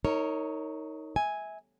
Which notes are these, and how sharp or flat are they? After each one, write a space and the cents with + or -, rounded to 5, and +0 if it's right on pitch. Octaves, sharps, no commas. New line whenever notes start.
D#4 +20 A#4 -25 C#5 +0
E5 -25 G#5 +0